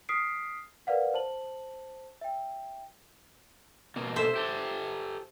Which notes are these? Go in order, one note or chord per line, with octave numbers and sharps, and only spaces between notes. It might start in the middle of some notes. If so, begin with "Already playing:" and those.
D#6 F6 B6 C7 D7
A#4 B4 D5 F5 F#5
C5 A5 F#7
E5 G5
B2 A#3
C5 E5
G4 A4